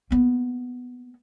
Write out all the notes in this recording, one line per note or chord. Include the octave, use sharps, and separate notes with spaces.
A#3 B3